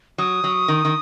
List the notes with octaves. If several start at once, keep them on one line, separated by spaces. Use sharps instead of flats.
F#3 D#6
F#3
D#3
D#3